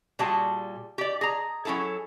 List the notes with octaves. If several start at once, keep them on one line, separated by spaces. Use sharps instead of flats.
A#2 G3 F#4 G#4 A5
G4 D5
G#4 A#5
F#3 C#4 E4 G#4 A4